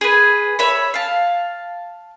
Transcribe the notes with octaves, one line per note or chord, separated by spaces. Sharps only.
G#4 B4
C#5 E5 B5
F5 A5